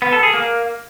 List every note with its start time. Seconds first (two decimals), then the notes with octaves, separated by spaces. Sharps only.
0.02 B3
0.12 A4
0.23 G#4
0.33 A#3